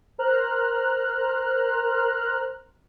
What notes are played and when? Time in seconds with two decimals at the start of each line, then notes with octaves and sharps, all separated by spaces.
0.18 A#4 C5 A#5 F6 F#6